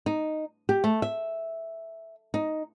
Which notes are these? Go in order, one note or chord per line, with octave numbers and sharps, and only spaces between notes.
D#4
G4
A3
E5
D#4